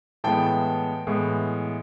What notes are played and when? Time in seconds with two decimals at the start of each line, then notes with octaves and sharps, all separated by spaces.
0.24 A2 E3 G#3 B3 G5 A5
1.07 A2 E3 G#3 B3